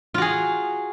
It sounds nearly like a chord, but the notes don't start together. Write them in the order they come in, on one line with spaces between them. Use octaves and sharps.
F4 F#4 G#4